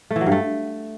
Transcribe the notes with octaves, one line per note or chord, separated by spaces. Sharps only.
A3
E3
F#3
G2
A3